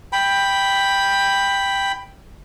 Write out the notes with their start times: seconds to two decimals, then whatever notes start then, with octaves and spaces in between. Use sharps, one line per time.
0.12 G5 B5